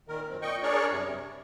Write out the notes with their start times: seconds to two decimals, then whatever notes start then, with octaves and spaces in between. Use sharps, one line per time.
0.08 A#2 D#3 A#4
0.29 F#2 C4
0.42 A#2 D#5 G5 C#6
0.63 D4 G#4 A#4 C#5 D5 C#6
0.91 F#2 C3 G3
1.07 C3